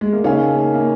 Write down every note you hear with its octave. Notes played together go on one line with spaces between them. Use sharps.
G#3
A#3
C#3 C#4 D#4 A#4 F5 G#5
A#3
A#3